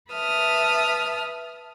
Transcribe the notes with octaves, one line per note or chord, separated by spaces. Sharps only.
B4 E5 A5 D#6 F6